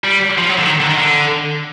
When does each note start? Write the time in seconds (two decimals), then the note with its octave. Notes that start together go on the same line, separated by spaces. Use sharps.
0.04 G3
0.38 F3
0.49 F#3
0.59 D3
0.66 D#3
0.81 D3
0.89 D#3
0.98 D3